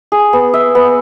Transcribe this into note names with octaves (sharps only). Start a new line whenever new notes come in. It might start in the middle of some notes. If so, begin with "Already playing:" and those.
G#4
B3
E5
B3